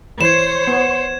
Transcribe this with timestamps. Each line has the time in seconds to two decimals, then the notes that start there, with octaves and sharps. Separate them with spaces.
0.21 E3 C5 C#5 G#6 E7
0.67 B3